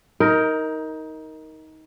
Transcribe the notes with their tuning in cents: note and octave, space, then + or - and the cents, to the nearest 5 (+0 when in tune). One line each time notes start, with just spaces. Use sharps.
D#4 +20 A#4 +0